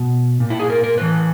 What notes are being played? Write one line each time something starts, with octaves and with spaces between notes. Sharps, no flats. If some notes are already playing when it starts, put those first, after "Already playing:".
Already playing: B2
A#2
E4
G#4
A#4
A#4
A2 E3 B4